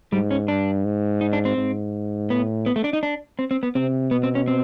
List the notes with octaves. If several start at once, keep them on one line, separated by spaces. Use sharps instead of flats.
G#2 G3
C#4
G2 D4
G#2
D#4
D4
C4
G#2
A2 B3
B3
A3
D4
D#4
D4
C4
C4
B3
C3 C4
B2 B3
C4
C#4
C4